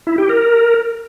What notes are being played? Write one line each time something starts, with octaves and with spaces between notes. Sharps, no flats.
E4
G4
A#4